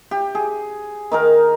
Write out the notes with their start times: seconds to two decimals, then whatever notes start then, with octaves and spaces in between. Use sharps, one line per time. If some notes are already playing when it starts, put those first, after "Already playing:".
0.11 G4
0.35 G#4
1.12 D#3 D#4 A#4